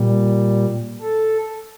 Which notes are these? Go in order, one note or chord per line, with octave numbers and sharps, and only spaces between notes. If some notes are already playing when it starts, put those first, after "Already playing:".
Already playing: A#2 G3
A4